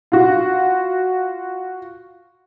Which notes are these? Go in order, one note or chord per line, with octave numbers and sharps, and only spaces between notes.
F4 F#4